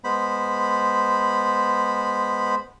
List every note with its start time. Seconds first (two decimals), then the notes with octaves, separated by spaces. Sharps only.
0.04 G#3 B3 C5 B5